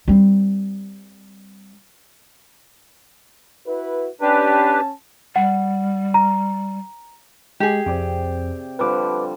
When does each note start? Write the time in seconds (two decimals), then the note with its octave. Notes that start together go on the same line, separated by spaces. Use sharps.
0.08 G3 C4
3.67 E4 F#4 B4
4.21 C#4 D4 G4 B4 A5
5.36 G3 F#5
6.14 A#5
7.60 G#3 G4 G#4
7.86 F2 C3 D5 G5
8.79 D3 F3 G3 B4 D6